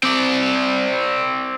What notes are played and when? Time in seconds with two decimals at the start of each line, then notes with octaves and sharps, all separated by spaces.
0.03 C4 D5